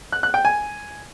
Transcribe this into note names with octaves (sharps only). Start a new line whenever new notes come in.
F#6
F#6
G5
G#5